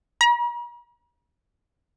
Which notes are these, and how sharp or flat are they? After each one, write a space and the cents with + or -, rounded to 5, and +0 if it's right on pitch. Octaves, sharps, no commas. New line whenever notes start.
A#5 +45